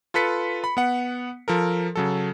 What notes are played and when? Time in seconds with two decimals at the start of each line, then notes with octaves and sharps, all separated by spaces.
0.14 F4 A4 B4 B6 C#7
0.64 B5
0.77 B3 F#5
1.48 F3 A4 A#4
1.95 C#3 F#3 A4